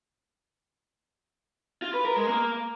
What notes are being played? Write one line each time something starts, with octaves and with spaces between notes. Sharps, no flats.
F4
B4
A#4
G#3
A#3